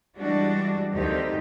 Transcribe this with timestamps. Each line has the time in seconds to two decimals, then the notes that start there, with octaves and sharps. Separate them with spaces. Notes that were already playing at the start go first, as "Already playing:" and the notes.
0.16 E3 G3 G#3 D4 F#4
0.93 D2 D#3 C4 D#4 G4